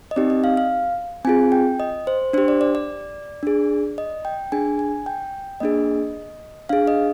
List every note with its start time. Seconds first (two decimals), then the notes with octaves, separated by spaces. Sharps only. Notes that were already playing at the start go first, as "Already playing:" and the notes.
0.11 D#5
0.16 C4 D#4 G4 D5
0.30 D#5
0.44 F5
0.57 F5
1.25 C4 F4 G#4 G#5
1.52 G5
1.80 D#5
2.07 C5
2.33 D4 G4 C5
2.48 D5
2.61 D5
2.75 D5
3.43 D4 G#4
3.98 D#5
4.25 G5
4.52 D4 G#4 G#5
4.79 G#5
5.06 G5
5.60 A#3 D4 G#4 D#5
6.69 D4 G#4 F5
6.87 D#5